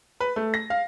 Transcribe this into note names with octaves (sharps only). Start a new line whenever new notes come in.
B4
A3
A#6
F5